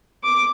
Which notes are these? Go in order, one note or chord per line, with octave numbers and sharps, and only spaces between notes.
D6